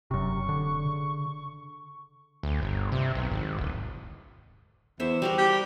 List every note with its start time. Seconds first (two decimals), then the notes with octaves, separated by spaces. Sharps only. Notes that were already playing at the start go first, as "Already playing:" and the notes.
0.11 E1 F#2 C3 C#6
0.49 D3
0.85 C#3
2.43 D2
2.62 G1
2.92 C3
3.15 B1
3.31 G#1
3.58 D1
5.00 E2 C5 E5
5.22 G3 F#4 A#4
5.38 G4